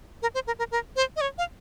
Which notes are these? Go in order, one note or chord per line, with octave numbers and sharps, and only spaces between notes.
A#4
C5
A#4
A#4
A#4
C5
D#5
C#5
F5